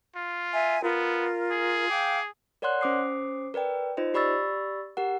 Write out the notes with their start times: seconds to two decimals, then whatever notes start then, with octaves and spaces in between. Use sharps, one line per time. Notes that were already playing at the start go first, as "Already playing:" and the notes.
0.15 F4
0.51 E5 G#5
0.83 B3 F4 A#4
1.51 G#4
1.89 F5 G5 D6
2.62 A#4 C#5 D5 F#5 C6 F#6
2.81 C#4 C5 D6 D#6 C7
3.54 A#4 B4 D5 G5
3.97 D#4 F4 C5 D#5
4.14 G4 D5 B5 C#6 E6 A6
4.97 G4 A#4 F#5